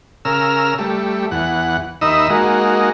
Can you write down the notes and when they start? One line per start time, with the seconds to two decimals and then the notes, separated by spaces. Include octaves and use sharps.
0.25 C#3 A#4 E6 F6
0.79 G3 A3
1.31 E2 F#5
2.01 D#2 D#4 D#5 E5 B5 E6
2.30 G#3 A#3 D#4 F#4